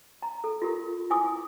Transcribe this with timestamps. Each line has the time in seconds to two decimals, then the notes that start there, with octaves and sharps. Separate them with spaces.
0.22 A#5
0.44 A4
0.62 F4 G4 A#4
1.10 E4 G#5 D6 D#6